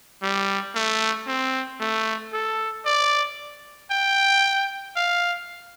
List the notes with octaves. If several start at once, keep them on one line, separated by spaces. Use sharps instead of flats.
G3
A3
C4
A3
A4
D5
G5
F5